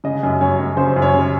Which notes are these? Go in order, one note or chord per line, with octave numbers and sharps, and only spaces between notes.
C#3 D#5
F#2
F#2 C#5
F#2
C#3 C5
F#2
C#5
C#3